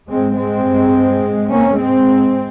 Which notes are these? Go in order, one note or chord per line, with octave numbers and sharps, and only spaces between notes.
G#2 G#3 C4
G#3 C4
G2
G#2
A#3 C#4
G#2 G#3 C4